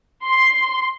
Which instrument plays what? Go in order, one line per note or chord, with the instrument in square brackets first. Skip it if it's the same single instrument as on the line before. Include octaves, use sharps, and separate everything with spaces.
[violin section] C6